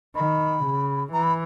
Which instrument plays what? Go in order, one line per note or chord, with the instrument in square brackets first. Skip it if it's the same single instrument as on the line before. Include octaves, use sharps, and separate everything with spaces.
[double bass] D#3 [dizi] B5
[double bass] C#3
[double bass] E3 [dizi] A#5
[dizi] B5